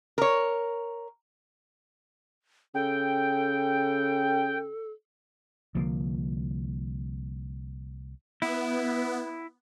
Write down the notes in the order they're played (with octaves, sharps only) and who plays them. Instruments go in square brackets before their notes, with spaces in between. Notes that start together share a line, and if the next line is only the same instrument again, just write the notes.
[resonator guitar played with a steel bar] A#4 C#5
[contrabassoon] C#3 [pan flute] A4 [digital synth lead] G5
[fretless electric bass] C2 D3 F3 A#3
[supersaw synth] B3 [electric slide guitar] E4